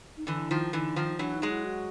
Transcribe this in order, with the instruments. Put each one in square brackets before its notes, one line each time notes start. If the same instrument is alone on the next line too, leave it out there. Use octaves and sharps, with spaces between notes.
[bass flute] D#4
[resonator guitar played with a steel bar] D3 E3 [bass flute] E4
[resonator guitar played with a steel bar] D#3 F3
[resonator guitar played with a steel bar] D3 E3 [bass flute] D#4
[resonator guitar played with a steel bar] D#3 F3
[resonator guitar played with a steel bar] E3 F#3 [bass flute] D4
[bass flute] D#4
[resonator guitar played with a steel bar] F#3 G#3
[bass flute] E4
F#4